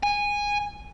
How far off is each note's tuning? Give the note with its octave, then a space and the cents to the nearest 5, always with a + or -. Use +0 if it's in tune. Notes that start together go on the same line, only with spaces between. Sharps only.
G#5 -15